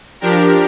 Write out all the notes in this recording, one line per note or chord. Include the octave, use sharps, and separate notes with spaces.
F3 D4 G4 A#4